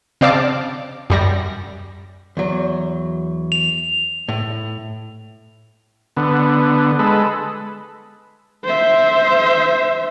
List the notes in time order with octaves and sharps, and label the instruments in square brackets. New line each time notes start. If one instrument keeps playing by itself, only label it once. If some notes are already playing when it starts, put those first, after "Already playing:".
[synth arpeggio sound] C#3 C4 D5 F5 A5 D6
F#2 G3 A#6
[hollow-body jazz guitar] E2 F#3
[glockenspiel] F7
[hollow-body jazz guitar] A2
[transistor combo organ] D3 B3
G#3 A4 B4
[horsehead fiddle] C5 E5